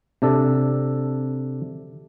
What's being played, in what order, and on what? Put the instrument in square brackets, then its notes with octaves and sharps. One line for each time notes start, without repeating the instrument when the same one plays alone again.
[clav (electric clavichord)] C3 D4 A4